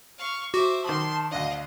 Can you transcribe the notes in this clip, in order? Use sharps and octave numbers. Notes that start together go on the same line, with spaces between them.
F5 C#6
F#4 C5 E5 D6
D#3 A5 C6 D6 D#6
D2 D4 D#5 F5